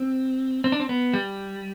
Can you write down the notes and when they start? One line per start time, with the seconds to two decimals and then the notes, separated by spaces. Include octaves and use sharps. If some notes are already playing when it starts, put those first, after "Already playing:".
Already playing: C4
0.64 C4
0.72 D4
0.80 C4
0.89 B3
1.14 G3